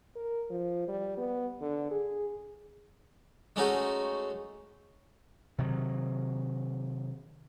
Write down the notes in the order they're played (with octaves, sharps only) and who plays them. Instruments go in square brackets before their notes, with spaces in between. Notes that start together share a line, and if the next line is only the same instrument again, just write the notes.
[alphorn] A#4
F3
G3
B3
D3
G#4
[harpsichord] G#3 A3 C#4 D#4 F#4 G#4
[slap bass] C3 D#3 F#3